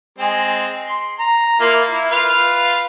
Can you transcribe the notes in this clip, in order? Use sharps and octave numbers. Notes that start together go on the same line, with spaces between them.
G#3 C4
C6
A#5
A#3 E4 F4
E4
F4 B4 F5